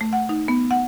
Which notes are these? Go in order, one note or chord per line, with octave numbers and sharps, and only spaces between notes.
A3
F#5
D#4
B3
F#5